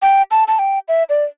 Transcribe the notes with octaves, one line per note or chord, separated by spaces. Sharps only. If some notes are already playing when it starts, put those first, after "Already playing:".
G5
A5
A5
G5
E5
D5